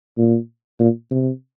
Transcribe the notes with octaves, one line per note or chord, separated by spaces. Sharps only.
A#2
A#2
C3